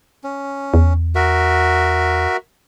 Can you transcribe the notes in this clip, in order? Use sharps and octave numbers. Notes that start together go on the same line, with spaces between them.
C#4
E2
F#4 A#4 E5